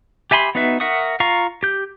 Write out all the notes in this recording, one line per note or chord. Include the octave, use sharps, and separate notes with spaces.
G4 E5 G#5 B5 C6
B3 D#4 F#4 B4 E5
A#4 E5 F#5 C#6 D#6
F4 F5 A#5 C#6
G4 G6